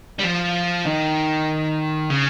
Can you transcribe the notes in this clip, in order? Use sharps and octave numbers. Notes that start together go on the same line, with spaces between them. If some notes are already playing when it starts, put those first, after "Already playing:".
G3
F3
D#3
C#3